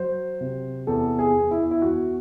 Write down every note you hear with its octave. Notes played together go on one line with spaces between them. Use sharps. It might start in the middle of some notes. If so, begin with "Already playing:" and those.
Already playing: F#3 C5
C3
E2 A4
G#4
E2
E4
E4
E2 F#4